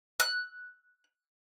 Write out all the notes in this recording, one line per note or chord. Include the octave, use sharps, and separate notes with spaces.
F#6